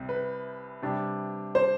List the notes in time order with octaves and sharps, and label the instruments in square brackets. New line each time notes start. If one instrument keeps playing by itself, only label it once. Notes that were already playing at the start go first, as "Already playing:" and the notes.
Already playing: [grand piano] C2 C3 C4
[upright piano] B4
[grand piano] C3 G3 D4 G4
[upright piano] C5